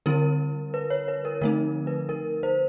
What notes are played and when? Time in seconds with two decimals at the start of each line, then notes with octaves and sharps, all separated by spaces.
0.06 D3 G3 C4 E4 A#4
0.74 B4
0.90 C#5
1.08 B4
1.25 A#4
1.41 D3 F3 A3 C4 D#4 A#4
1.87 B4
2.09 A#4
2.43 C5